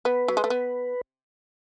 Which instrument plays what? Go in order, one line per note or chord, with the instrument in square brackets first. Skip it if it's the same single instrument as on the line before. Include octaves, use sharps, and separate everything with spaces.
[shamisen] B3 [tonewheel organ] B4
[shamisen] F#3
G#3
A3
B3